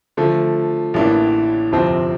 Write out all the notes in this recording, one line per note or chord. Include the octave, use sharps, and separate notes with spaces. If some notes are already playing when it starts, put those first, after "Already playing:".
D3 F3 A3
A1 A2 E3 A#3 D4
G1 F2 C3 F3 C4